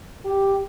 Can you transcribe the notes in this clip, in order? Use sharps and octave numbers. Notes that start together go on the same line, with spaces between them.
G4